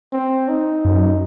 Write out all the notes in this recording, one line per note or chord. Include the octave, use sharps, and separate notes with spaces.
C4
D#4
F#2